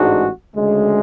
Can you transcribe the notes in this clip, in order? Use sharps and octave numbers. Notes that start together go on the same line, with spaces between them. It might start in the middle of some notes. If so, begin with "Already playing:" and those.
Already playing: A1 G#2 G#3 D4 F#4
D2 C#3 G#3